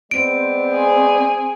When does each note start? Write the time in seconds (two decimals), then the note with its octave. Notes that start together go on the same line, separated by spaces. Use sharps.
0.11 G#3 B3 C4 D5 D7
0.72 G#4